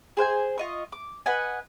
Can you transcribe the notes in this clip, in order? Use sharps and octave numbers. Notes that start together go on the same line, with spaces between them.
G#4 C5 F#5 G#5
F4 D#5 C#6
D6
B4 D#5 F#5 G#5